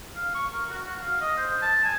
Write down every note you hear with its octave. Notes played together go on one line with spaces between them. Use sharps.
F5
C#6
A#4
F#4
F#4
F5
D#5
C5
A5
G#5